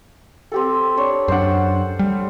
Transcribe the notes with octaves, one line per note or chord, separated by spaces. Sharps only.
C4 G4 A4
D4 C#5
F#2 D4 C5 F#5
G3